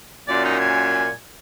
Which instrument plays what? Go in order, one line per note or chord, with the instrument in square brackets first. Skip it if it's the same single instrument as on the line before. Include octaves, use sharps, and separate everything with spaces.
[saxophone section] F#2 A#2 [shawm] D5
[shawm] D#4
G#5